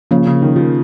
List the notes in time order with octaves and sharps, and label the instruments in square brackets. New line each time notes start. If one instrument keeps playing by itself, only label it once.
[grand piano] C#3 [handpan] F3 A#3 C#4
[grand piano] C#3
D#3
F3